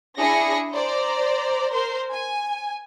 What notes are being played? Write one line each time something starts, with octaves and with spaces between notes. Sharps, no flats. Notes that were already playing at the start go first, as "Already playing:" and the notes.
D4 E4 G#4 A#6 C#7
C5 D5 A#5
A#4 C5 C6
G#5